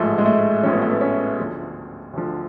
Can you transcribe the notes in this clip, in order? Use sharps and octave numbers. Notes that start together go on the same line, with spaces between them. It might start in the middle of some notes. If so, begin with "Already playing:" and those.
Already playing: A1 G#2 F3 A3
G#3
A3
A1 G#2 F3 C#4
B3
A3
B3
C#4
D2 D3 F3
D2 D3 F3